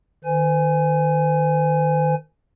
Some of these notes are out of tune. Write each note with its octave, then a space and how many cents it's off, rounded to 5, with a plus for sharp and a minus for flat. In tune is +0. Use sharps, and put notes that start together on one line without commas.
D#3 -15 C5 -45 G#5 +0